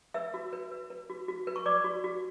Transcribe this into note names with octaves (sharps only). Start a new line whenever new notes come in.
B4 E5 E6
F#4
B4
B4
B4
F#4
F#4
B4
C#6
B4 D5 D6
F#4
F#4